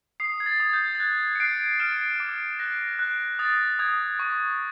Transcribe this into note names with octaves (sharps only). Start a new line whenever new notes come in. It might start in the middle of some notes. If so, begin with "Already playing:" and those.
D#6 C7
G#6
A6
D#6
G6
A6
F#6 G#6
C#7
F#6 C7 D7
F6 D7 E7
D6
F#6 A#6
F#6
D#6 A6
D#6 G#6
C#6 A6